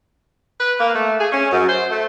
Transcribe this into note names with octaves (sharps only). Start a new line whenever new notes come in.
B4
A#3
A3
G#4
C#4
F#2
C5
A3